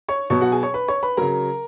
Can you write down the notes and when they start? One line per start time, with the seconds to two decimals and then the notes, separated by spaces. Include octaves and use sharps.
0.09 C#5 C#6
0.30 B2 F#3 C#5 C#6
0.41 F#4 F#5
0.52 G#4 G#5
0.63 C#5 C#6
0.74 B4 B5
0.88 C#5 C#6
1.03 B4 B5
1.17 C#3 F#3 A#4 A#5